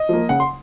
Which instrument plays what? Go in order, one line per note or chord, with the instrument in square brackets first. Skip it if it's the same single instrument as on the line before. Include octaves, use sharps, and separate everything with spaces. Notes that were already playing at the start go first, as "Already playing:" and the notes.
Already playing: [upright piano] D#5
[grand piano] F3 A#3
[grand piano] C#3 [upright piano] F#5
[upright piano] C6